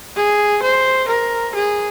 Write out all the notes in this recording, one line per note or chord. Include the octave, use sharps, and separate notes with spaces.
G#4
C5
A#4
G#4